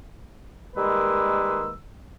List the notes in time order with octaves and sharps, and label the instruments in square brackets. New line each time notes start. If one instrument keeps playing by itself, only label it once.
[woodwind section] D#3 G3 G#3 A#3 B4 E6